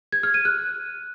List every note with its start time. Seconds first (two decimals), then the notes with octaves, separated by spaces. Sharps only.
0.12 G#6
0.23 F6
0.34 D#7
0.45 F#6